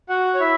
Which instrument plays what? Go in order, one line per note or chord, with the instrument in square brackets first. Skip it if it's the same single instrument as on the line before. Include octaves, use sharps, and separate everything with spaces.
[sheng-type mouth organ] F#4 F#5
C#5
E4 E5